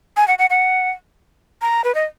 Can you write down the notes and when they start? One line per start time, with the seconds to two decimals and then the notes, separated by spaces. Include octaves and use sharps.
0.17 G#5
0.28 F#5
0.39 F#5
0.50 F#5
1.62 A#5
1.84 B4
1.95 D#5